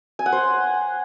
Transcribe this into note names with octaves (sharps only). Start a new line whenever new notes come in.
G#5
F#5
C5